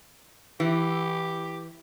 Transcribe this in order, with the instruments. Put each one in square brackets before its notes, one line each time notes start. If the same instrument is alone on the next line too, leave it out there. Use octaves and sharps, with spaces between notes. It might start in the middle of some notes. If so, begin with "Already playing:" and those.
[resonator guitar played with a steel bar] E3 [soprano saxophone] G4